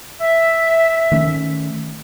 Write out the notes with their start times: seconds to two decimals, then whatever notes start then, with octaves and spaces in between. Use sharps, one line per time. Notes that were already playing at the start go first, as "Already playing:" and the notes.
0.21 E5
1.12 D#3 A3 C#4